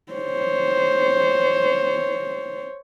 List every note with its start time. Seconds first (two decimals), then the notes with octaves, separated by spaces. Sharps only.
0.12 C5 C#5